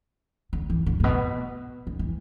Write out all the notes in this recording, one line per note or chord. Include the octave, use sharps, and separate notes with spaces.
D3
E3
D3
A2
B2
D3
E3